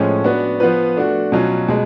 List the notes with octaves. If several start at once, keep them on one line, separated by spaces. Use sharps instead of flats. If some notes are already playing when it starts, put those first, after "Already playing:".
Already playing: A2 F3 G#3 C#4
B3 D4 F#4
F3 B3 F4 B4
A3 D4 F#4
B2 F#3 C#4 F4
B2 G#3